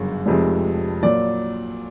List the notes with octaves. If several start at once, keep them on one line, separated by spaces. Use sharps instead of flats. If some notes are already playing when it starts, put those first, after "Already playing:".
Already playing: G1 F#2 C#3
F1 F2 C3 F3 G#3
A#2 F#3 D5